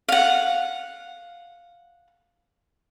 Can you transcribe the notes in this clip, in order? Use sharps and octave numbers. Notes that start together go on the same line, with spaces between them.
F5 F#5